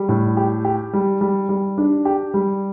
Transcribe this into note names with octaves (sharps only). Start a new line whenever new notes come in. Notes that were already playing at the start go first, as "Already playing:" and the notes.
Already playing: G3
A2
G4
G4
G3
G3
G3
D4
G4
G3